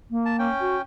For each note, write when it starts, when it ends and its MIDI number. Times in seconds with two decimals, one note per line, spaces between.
0.10 0.49 58
0.25 0.36 81
0.39 0.81 61
0.39 0.81 79
0.61 0.76 66